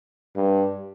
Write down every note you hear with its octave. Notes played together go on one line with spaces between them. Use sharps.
G2